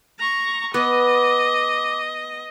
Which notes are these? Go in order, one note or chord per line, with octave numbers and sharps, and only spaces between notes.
A#5 C#6
B3 D#5 D6